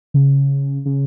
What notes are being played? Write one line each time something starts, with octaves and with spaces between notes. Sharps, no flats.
C#3
C#3